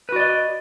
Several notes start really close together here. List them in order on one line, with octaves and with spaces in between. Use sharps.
B4 F#4 D5 D#5